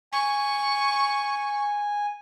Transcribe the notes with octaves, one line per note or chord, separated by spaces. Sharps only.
G#5 C#6